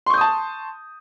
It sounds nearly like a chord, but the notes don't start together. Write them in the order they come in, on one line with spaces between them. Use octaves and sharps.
C6 C#6 G6 D#6 A5